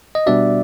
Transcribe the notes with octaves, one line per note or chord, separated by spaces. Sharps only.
D#5
B2 G3 B3 D4 F#4 D5 E5